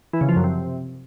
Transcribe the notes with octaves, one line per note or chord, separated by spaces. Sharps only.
E3
C#3
F3
F#2
C3